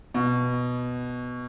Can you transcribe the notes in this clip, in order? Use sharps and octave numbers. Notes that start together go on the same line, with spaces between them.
B2